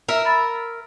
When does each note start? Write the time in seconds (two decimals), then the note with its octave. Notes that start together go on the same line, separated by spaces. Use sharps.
0.09 A#4 E5
0.25 B5 A6